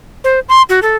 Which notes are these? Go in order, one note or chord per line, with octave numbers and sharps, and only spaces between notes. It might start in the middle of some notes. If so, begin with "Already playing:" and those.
C5
C6
F#4
A4